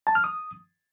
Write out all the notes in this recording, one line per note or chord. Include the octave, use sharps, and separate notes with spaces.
A5
F6
D#6